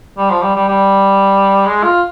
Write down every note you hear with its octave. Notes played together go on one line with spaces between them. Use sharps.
G3
F3
G3
G3
G3
G#3
F4